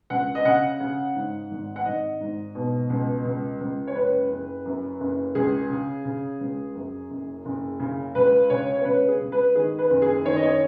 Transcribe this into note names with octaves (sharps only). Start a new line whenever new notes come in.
C#2 F#5
D#5
C#3 F#5
C#3
G#2
G#1
F#5
G#1 D#5
G#2
B2
C#2
C#2
C#2
C#5
F#1 B4
F#1
F#2
F#1
C#2 G#4
C#3
C#3
C#2
F#2
F#1
F#1
C#3
C#2 B4
C#3 C#5
C#5
C#2 B4
G#4
C#2
B4
D#3 G#4
B4
F#1
G#4
D#3 C#5
D#5
C#5